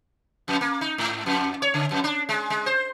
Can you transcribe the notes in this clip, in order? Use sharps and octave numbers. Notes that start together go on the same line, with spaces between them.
F2
A#3
D#4
G#2
F2
C#5
C#3
F2
D4
G#3
G#3
C5